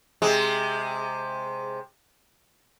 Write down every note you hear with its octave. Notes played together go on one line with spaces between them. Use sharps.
C3 G#3